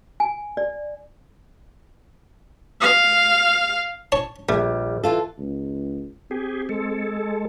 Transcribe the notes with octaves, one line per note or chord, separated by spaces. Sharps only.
G#5
D5
F5
C#5 A5
A#1 G3 A3
E3 F4 A4
C#2
C4 G4 G#4
G#3 A4